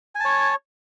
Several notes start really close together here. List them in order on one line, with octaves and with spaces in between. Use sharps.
G#5 A5 C#5